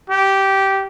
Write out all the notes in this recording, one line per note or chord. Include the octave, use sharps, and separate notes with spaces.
G4